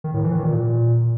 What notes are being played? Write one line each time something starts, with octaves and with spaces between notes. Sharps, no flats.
D#3
A2
E3
D#3
A#2